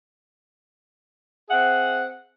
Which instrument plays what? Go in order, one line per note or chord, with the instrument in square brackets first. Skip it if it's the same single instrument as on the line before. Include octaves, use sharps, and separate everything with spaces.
[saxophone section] C4 G#4 E5 F#5